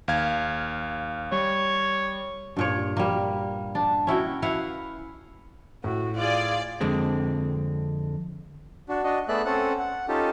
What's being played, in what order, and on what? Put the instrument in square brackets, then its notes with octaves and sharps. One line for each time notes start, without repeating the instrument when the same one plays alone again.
[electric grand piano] D#2 F5 G#6
[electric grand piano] G3 [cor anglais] C#5
[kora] G2 A#2 C#5
G3 A#3
D4
C#4 E4 F#4 G5
E4 B4 F5 F#5
[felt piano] A2 [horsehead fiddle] F#4
[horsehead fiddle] F4 G#4 [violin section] D5
[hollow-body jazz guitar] F2 D3 G#3 C4
[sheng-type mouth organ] D4 F#4
D4 F#4 D#5
A3 B3 G#4 D5 E5 F#6
C4 C#4 A4 F#5
F#5
C#4 D#4 F4 G4 A4